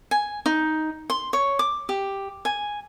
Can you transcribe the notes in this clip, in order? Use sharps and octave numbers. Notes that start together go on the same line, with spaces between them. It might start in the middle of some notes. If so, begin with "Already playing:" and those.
G#5
D#4
C6
C#5
D6
G4
G#5